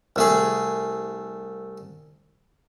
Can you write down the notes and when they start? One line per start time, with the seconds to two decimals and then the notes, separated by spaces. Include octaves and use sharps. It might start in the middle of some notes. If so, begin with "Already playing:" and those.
0.16 C2 A3 G#4